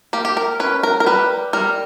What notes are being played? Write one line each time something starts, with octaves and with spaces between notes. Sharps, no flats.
A#3 G4
G4
A#4
C#4 B4
A#4
A#4
G3 B4
G3 A#4